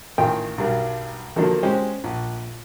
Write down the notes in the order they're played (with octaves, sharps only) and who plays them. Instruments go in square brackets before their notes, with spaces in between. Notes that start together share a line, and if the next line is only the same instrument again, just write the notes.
[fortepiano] A1 D#3 F4 G5
B1 G2 G3 A#4
D3 D#3 F3 F#3 A#3 D4
G#3 C#4 G4 C5
A#1